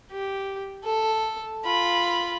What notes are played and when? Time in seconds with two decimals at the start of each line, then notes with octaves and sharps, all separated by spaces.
0.11 G4
0.84 A4
1.64 F4 B5